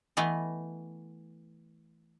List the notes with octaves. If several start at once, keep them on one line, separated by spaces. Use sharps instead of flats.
E3 A3 B3 D#5